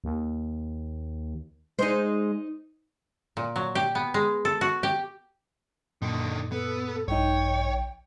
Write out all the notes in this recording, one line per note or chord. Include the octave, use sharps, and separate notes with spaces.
D#2
G#3 D#4 C5
A#2
F#3
G4
B3
G#3
A4
F#4
G4
F#2 A#2 D3 D#3
B3 A4
A#1 G2 D#4 C#5 G5